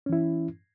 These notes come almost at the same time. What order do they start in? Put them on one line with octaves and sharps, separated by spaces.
C#4 E3 E4